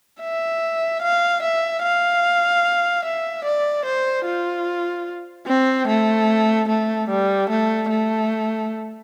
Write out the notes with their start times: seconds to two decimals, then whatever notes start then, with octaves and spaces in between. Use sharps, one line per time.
0.21 E5
1.02 F5
1.43 E5
1.83 F5
3.05 E5
3.45 D5
3.85 C5
4.26 F4
5.47 C4
5.88 A3
6.68 A3
7.09 G3
7.50 A3
7.90 A3